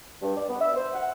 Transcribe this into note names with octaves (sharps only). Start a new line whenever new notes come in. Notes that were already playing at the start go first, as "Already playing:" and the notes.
G2
D5
B3
E5
C5
F#5